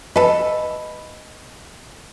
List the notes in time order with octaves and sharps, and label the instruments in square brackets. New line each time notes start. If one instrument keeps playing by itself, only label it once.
[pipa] A4 B4 [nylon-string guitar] D#5